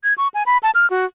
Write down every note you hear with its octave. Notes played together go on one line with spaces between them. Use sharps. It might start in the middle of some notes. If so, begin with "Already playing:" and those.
G#6
C#6
G#5
B5
A5
F6
F#4